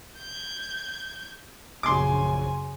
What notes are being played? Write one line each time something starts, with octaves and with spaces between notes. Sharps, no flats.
G6 G#6
A#1 F#2 C#3 G#5 C6 D6